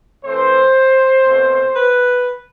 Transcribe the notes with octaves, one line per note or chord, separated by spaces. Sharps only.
E3 A3 C4 C5
B2 A3 C4
B4